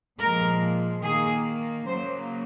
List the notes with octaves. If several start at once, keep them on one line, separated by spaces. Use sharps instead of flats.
A#2 F3 G#3 A#4
D#3 A#3 G#4
C#3 F#3 A#3 C5